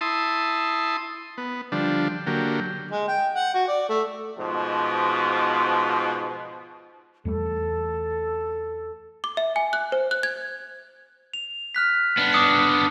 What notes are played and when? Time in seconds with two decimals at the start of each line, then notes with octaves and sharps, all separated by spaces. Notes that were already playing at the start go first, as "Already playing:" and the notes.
0.01 E4 A5 C6 D#6
1.38 B3
1.72 D3 F3 G3 D4
2.27 D3 F#3 A#3 G4
2.92 G#3
3.08 G5
3.35 F#5
3.54 F#4
3.68 D5
3.89 A3
4.38 G#2 B2 F3
7.25 E2 G3 A3 A4
9.24 D6
9.37 E5
9.56 G#5
9.73 F#6
9.92 C5
10.11 F#6
10.23 G#6
11.34 F7
11.75 F6 F#6 B6
12.17 B3 D4
12.33 D6 D#6 C#7